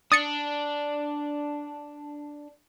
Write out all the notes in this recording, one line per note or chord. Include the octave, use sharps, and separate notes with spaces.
D4 D#6 A6 C#7